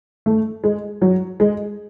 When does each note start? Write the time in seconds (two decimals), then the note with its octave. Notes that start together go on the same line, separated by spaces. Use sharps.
0.26 A3
0.64 G#3
1.02 F#3
1.40 G#3